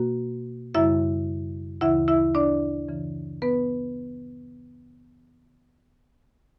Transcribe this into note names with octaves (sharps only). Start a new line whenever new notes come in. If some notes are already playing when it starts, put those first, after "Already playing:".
Already playing: B2 A#3 F#4
F#2 C#3 G3 E4 E5
D2 C#3 E3 E4 E5
E4 E5
D4 D5
F#2 C#3 E3
B3 B4